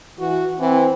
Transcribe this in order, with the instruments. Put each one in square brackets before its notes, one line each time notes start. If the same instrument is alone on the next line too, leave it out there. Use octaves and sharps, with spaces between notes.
[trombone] E3 [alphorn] F#4
[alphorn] E3 [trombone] C4